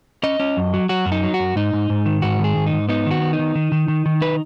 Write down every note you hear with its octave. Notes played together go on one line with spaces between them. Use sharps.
C#4 D#5
C#4
F#2
F#3
F#3 F#4
F#2
D#4
F#3
F#4
F#2
G#2 D#4
G#2
G#2
D#3
G#2 F#4
D#3
G#4
G#2
D#4
G#2
B3 D#4
D#3 F#4
B3
D#4
D#3
D#3
D#3
D#3
D#3
D#4 B4